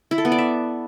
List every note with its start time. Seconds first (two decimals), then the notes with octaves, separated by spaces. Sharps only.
0.11 E4
0.18 A4
0.25 B3
0.32 D5
0.38 E5